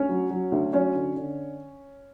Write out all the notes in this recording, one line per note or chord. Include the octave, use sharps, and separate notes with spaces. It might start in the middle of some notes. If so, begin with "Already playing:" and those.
Already playing: D2 C#4 C#5
F#3
F#3
D2
F#3 C#4 C#5
D3
D3